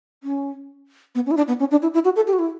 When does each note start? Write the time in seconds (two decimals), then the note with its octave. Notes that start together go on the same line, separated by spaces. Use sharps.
0.23 C#4
1.15 B3
1.26 C#4
1.31 E4
1.37 D4
1.48 B3
1.60 C#4
1.71 D4
1.82 E4
1.94 E4
2.05 F#4
2.16 A4
2.27 G4
2.33 F#4
2.39 E4